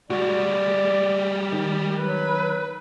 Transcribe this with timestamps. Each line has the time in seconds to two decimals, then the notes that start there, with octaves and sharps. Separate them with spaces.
0.10 G3 G#3 F#4 D5
1.53 D#3
1.99 F#3 B4